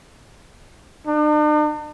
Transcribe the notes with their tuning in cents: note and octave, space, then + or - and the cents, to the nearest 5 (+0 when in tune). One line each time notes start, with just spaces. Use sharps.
D4 +45